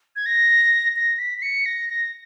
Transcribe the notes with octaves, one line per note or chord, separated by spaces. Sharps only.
G#6
A#6
A#6
B6
B6
C#7
A#6
A#6